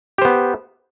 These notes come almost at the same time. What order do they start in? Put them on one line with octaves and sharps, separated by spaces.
G4 C5 B3